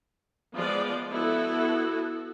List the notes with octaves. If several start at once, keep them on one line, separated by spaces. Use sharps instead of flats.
F3 G#3 B3 F4 D5
B3 E4 F#4 A4